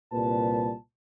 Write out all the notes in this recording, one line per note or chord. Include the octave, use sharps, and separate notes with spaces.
C2 A#2 G3 B4 A5